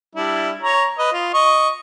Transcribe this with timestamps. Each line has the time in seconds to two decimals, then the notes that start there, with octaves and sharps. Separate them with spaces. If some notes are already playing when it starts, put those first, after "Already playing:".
0.15 G3 D4 E4
0.62 C#5 A#5
0.98 B4 D#5
1.13 F4
1.34 D#5 C#6